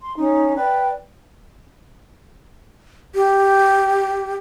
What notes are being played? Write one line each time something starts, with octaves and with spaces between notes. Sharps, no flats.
C6
C#4 D#4
B4 D5 G5
G4